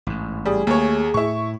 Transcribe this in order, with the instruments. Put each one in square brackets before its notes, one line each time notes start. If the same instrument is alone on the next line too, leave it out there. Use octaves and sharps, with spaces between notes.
[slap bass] A1 G#2
[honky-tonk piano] G3 [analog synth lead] G#4
[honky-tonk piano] D#2 C#5 [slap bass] A3
[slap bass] A2 [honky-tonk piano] E4 C#6